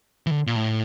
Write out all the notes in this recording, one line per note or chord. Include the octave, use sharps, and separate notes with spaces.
E3
D3
A#2
A2